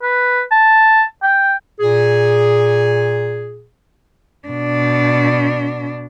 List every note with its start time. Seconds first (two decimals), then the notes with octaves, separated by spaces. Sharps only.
0.02 B4
0.51 A5
1.23 G5
1.80 A#2 G#4
4.48 B2 D4